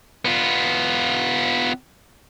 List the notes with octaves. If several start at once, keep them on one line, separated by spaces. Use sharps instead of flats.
B3 F4